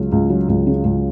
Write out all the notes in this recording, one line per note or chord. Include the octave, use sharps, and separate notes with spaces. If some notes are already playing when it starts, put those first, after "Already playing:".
Already playing: C#2 C#3 F#3
C#2
F#3
C#2
C#3
C#2